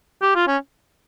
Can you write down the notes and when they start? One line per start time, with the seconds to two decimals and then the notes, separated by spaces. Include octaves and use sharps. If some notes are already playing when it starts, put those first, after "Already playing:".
0.22 G4
0.35 F4
0.48 C#4